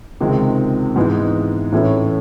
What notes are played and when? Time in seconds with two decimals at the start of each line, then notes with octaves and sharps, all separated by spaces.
0.20 C#2 C3 D#3 G#3 C4
0.96 G#2 E3 G#3 B3 D#4
1.72 A2 E3 A3 C#4 E4